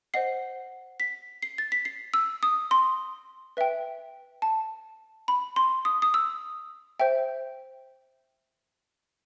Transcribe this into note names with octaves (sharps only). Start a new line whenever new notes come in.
C5 D#5 F#5 C7
B6
C7
A6
B6
C7
E6
D#6
C6
B4 E5 G5
A5
B5
C6
D#6
D#6
E6
C5 E5 G5